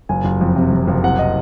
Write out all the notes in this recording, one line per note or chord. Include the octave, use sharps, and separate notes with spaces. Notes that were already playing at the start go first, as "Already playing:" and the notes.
F#1 G#5
F#1
F2
C3
F#1
F#1
C2 F#5
D#5